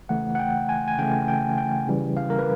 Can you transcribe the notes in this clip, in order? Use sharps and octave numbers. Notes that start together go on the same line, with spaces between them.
C#3 E3 A3 F#5
F#5
G5
G#5
G#5
C#3 E3 A3 G5
G5
G5
C#3 E3 G3
F5
A#4
B4